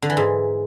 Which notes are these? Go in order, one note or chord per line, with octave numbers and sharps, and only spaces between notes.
D3
E3
G#2